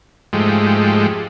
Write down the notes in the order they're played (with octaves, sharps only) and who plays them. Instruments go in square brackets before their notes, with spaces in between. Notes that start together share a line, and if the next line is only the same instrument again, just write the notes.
[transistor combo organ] G#2 F3 G#3 A3 G4